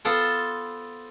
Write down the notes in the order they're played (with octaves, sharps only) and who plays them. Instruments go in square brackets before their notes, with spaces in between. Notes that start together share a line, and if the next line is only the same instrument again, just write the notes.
[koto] B3 F4 A4 C5 G5